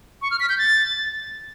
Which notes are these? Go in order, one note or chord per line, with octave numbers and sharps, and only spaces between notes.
C#6
F6
B6
G6
A6